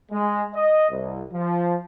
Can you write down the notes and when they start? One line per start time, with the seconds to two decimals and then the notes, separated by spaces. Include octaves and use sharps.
0.12 G#3
0.54 D#5
0.90 C2
1.32 F3